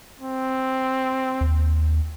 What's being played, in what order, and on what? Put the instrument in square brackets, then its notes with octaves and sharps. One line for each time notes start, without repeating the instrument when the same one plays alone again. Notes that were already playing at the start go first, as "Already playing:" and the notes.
[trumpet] C4
[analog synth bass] D#2